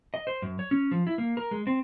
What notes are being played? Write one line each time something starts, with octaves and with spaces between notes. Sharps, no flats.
D#5
C5
F#2
C#5
C#4
F3
E4
A#3
A#4
G#3
C4